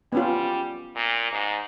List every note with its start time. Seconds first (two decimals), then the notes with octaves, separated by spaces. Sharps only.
0.12 G3 B3 C#4 F4
0.96 A#2
1.32 G#2